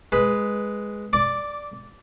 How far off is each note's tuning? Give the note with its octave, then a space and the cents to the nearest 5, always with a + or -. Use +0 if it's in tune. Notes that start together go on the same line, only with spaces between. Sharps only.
G#3 +0 B4 +0
D5 +0 D6 -15